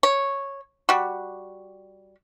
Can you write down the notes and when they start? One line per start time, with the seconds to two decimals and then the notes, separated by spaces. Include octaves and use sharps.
0.03 C#5
0.89 G3 F#4